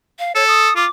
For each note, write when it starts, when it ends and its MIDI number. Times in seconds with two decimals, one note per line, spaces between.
0.19 0.35 77
0.35 0.70 69
0.35 0.46 73
0.47 0.74 87
0.76 0.85 65
0.76 0.90 86